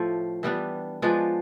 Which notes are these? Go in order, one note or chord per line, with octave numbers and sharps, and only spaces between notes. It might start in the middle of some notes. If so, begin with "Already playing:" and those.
Already playing: A2 F3 A3
E3 G3 B3 D4
F3 G#3 B3 D4